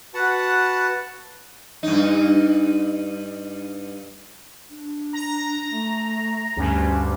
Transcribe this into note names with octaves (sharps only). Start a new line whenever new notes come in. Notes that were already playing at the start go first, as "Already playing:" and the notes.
F#4 B4 F#5 A5
G2 D#4
D4
A#5
A3
D2 G2 C#4